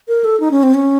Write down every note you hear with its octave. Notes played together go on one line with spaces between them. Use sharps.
A#4
A4
D#4
C#4
C4
C#4